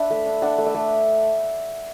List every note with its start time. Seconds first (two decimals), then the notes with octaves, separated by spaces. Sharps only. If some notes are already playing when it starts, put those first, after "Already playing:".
Already playing: D4 B4 E5
0.10 A3
0.26 D4
0.42 D4 F#5
0.58 A3
0.66 E5
0.75 A3